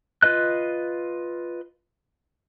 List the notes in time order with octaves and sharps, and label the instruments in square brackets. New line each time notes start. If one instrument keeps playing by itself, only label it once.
[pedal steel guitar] F4 B4 D#5 F#6